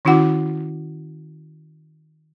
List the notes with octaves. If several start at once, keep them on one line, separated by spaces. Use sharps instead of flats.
D#3 C#4 E4 F#4 F#5 D6